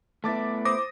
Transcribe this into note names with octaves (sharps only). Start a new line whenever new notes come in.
A3 B3 E4 A5 D6 A6
C5 D6 D#6 A#6